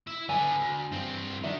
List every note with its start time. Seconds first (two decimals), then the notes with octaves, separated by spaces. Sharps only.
0.07 E4 E5
0.29 D3 B3 G#5
0.60 D2
0.92 G2 C4
1.43 D#3 D4 F#4 E5